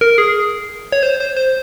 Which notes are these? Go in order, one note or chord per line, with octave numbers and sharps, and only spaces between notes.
A#4
G#4
C#5
C5
C5
C5